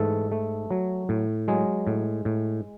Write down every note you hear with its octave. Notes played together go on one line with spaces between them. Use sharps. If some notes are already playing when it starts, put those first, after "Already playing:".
Already playing: G#2 E3 A3 A4
A3
F#3
A2
F#3 G#3 G#4
A2
A2